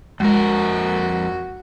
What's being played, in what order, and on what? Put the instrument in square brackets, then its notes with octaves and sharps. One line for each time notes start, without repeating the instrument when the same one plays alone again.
[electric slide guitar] F2 A#4 [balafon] G#3 [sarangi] F#4